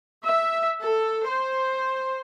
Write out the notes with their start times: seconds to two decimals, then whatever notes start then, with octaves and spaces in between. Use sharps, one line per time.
0.23 E5
0.83 A4
1.24 C5